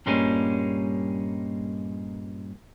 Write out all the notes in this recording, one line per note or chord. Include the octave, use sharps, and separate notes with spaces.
G2 A#2 G3 G#3 A#3 C#4